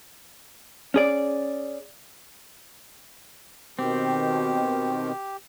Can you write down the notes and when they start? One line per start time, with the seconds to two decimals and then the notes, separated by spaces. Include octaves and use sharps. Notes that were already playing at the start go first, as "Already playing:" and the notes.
0.94 C#4 G#4 D5
3.79 B2 D#3 C4 G4